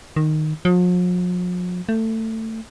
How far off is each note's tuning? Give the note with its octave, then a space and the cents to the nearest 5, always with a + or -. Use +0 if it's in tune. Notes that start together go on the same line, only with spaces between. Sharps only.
D#3 -10
F3 +45
A3 +20